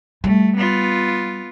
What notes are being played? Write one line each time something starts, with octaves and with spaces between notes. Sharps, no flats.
G3 A3
B3 F4